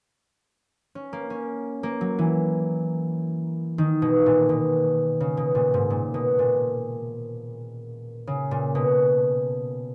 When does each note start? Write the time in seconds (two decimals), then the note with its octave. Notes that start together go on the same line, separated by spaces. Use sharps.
0.95 C#4
1.13 A#3
1.30 C#4
1.83 A#3
2.01 F#3
2.19 E3
3.78 D#3
4.02 B2
4.26 A#2
4.49 B2
5.20 C#3
5.37 B2
5.55 A#2
5.74 G#2
5.90 A#2
6.14 B2
6.39 A#2
8.27 C#3
8.51 A#2
8.75 B2